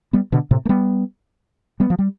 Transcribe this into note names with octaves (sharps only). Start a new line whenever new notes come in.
G3 B3
B2 D3
A2 C3
A3
G3 B3
G3 B3
F3
G3